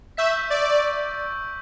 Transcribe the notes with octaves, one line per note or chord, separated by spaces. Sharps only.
E5 C#6 E6 G6 B6
D5